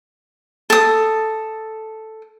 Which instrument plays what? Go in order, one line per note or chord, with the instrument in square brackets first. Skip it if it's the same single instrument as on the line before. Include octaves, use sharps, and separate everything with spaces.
[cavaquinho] A4 D#6